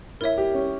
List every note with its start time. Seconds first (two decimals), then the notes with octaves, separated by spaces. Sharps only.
0.21 E4 A#4 C#5 E5
0.38 G4
0.54 C#4